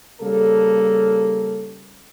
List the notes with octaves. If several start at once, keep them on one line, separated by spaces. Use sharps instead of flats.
C#3 G3 A#3 A4